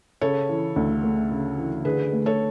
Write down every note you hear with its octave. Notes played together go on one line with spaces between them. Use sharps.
C#3 A4 C#5
E3
D2
A3
C#3
E3
D3 G#4 B4
A3
A4 C#5